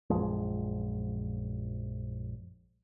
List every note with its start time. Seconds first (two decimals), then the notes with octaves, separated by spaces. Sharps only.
0.10 A#1 F#2 F3 G#3